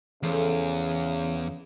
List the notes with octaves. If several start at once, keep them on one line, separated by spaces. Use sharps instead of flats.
E2 C#3 F3 A3 F4